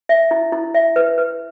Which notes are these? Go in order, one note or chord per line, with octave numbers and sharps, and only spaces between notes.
E5
E4
E4
E5
B4
B4